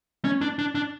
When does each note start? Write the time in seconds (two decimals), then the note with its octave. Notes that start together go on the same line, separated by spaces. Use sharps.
0.25 C#4
0.41 D4
0.59 D4
0.75 D4